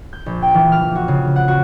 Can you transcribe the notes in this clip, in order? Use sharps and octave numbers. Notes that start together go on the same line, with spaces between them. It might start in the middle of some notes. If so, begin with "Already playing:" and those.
G6
A#1
G5
E3
F6
E3
F#4
C#3
F#5
F#4